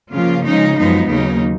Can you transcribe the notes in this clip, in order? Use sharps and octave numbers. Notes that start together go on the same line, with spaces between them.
C#3 F3 A#3 F4
C#3 F3 G#3 D#4
F#2 F3 G#3 B3 D#4
D#2 C#3 F#3 D#4